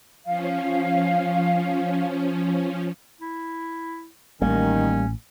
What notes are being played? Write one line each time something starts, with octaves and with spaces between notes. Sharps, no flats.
F3 C#4 F5
E4
A1 A2 D#3 G3 A#3 C#4